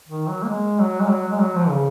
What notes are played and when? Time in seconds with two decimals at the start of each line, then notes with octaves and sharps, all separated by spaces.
0.08 D#3
0.29 F#3
0.43 A#3
0.49 G#3
0.80 F#3
1.00 G#3
1.10 F#3
1.31 G#3
1.41 F#3
1.55 F3
1.70 C#3